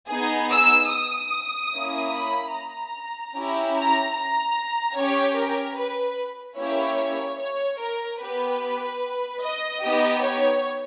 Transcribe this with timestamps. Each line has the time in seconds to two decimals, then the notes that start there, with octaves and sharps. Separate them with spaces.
0.10 B3 D#4 G#4
0.52 E6
0.92 D#6
1.73 A#3 C#4 E4
2.13 B5
2.54 A#5
3.35 C#4 E4 G4
3.75 A#5
4.15 A#5
4.96 C#4 G4 C#5
5.37 A#4
5.78 B4
6.58 A#3 C#4 E4 G4 C#5
7.39 C#5
7.80 A#4
8.20 B3 G4 B4
9.42 D#5
9.82 B3 D#4 G4
10.22 C#5